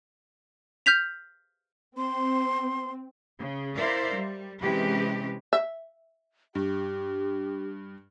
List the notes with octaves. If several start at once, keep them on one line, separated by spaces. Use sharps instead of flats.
F6 G6 B6 F7
C4 C6
C#3
E4 A#4 C5 D5 E5 F5
G3
C3 E3 G#3 C#4 G4 B4
E5
G2 G4